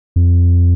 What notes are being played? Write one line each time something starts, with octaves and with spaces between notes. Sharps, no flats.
F2